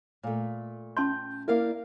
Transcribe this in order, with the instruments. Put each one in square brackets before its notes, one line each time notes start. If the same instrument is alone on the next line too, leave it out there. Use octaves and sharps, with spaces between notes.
[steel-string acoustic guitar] A#2 A3
[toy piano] C#4 A5 C6 [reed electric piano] G6
[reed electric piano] A#3 E4 [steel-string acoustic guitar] A#4 D5 F5